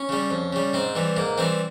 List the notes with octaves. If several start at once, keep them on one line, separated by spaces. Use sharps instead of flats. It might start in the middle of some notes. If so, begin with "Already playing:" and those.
Already playing: C#4
C#3 G3
F2
C#3 G3
G#2 C4
E3 G3
G#2 A#3
E3 G3 C4